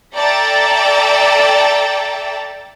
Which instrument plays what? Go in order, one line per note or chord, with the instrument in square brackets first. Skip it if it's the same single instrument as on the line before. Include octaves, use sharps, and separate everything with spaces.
[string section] A4 D5 E5 G5 A5 A#5